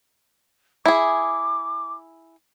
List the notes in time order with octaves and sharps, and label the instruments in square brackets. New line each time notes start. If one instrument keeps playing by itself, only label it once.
[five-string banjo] E4 G#4 [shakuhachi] D6